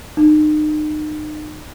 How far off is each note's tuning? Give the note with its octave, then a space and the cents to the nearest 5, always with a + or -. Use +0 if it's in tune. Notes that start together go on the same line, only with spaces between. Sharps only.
D#4 -35